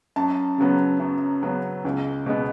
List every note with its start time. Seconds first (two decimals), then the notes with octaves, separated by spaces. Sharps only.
0.16 F#2 A5
0.58 C#3 F#3 B3
1.00 F#2
1.43 C#3 F#3 B3
1.85 C#2
2.26 B2 G#3 B3